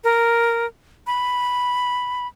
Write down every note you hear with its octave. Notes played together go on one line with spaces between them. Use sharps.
A#4
B5